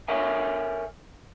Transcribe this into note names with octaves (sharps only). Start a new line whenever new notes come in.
A4 A#4 C#5 E5 G#5